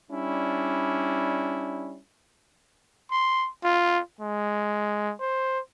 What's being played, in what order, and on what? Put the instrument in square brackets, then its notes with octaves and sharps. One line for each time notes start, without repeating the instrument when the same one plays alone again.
[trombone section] G3 C#4 D4 E4
[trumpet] C6
F4
G#3
C5